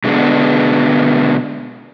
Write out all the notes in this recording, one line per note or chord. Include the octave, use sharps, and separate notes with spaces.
B2 D3 G#3 B3 D4